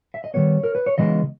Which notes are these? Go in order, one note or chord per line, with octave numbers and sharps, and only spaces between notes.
E5
D#5
D#3 G3 B3 C#5
A#4
B4
C#5
C#3 E3 G#3 B3 D#5